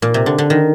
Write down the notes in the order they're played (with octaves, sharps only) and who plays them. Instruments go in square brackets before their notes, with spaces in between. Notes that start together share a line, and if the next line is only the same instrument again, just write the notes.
[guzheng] A#2
C3
D3
D3
D#3